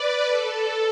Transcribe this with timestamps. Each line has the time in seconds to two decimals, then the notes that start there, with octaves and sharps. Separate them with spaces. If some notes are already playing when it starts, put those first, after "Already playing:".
Already playing: B4 D5
0.24 A4